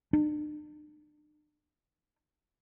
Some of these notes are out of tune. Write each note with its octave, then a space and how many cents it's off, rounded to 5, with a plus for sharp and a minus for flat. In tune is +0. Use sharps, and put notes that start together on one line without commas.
D4 +45